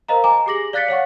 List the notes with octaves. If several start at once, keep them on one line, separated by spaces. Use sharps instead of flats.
A#4 C5 D#5 F5 A#5
G#5 A#5 D6
G4 G#4 D6 A#6 F#7
D5 F5 F#6 A6 B6 C#7
C#5 F5 F#5 C#6